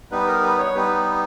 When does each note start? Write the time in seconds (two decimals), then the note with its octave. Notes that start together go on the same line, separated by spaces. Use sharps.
0.11 G3 B3 D#4 B4
0.27 A#4
0.43 B4
0.58 C#5
0.74 G3 B3 D#4 B4